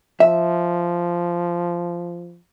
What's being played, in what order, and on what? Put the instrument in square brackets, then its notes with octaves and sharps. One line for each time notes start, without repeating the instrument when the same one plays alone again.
[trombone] F3 [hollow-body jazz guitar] E5